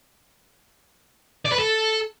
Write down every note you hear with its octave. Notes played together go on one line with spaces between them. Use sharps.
D5
B4
A4